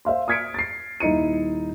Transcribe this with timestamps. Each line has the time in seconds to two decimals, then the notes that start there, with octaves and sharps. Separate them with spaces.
0.05 C5 E5 F5 C6
0.28 D#6 F6 G#6 B6 C#7 D7
0.54 A6 C7
1.00 D#1 D#4 E4 C#7 D#7